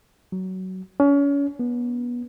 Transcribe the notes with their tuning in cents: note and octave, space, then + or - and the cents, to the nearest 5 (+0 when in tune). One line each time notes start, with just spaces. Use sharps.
F#3 +15
C#4 +35
B3 -25